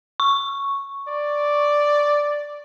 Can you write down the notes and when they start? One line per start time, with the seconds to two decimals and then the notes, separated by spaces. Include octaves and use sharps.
0.20 C#6
1.08 D5